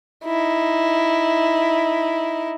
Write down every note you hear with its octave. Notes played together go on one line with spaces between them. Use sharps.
D#4 E4